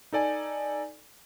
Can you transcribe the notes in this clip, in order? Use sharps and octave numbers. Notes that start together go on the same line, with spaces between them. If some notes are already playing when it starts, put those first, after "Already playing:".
D#4 A4 D5 G#5